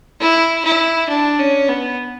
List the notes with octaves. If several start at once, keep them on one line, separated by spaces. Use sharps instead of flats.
E4
E4
D4
C#4
B3